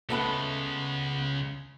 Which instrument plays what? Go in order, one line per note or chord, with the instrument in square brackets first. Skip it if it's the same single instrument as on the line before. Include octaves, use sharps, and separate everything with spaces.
[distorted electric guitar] C#3 G#3 [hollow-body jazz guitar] A3 B3 B4